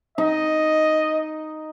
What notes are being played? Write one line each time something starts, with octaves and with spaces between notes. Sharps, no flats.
D#4 D#5